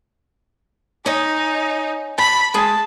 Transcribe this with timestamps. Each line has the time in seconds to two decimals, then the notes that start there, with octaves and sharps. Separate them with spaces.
1.06 C#4 D#4 D#5
2.18 A5 B5
2.54 G#3 G#4 A5